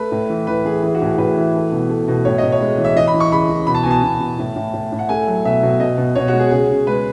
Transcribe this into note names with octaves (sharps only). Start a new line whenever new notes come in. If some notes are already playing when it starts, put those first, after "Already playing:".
Already playing: A3 B4
A2
E3
E3 B4
E3 G#4
E3 G#4
F#4
A2 G#4
A2 B4
E3
A3
B2
A3
B2
A2 C#5
A2 D#5
C#5
G#3
E3
E5
E3 D#5
B5
E3
C#6
C#3 B5
E3
B2 B5
A5
B2 G#5
A5
B2
B2
A2
A2
A2
A2
F#5
A3 G#5
F#3
B2 E5
B2
B2 D#5
B2
B2 C#5
F#4
G#3
G#4
C#3 G#4
C#3
G#3 B4